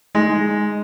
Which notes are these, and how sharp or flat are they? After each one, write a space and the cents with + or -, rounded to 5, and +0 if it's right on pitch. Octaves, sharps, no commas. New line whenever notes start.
G#3 +0 D#4 +10